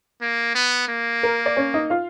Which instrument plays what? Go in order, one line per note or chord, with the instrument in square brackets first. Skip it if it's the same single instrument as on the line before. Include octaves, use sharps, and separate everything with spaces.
[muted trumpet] A#3
B3
A#3
[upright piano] A#4
D5
C#4 C#5
D#4 D#5
F4 F5